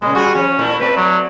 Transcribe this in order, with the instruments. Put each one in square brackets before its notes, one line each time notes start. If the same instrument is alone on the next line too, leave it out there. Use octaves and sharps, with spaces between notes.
[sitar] A#2 C#3 [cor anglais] G#3
[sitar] G3 F4 G#4 [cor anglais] F#4
[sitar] F3 [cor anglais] C#4
[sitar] A#2 A3 E4
[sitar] A3 C4 D5 [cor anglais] B4
[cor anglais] F#3